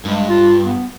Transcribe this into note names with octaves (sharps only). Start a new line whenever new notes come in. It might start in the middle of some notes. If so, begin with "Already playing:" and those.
G2 G#3
F4
B3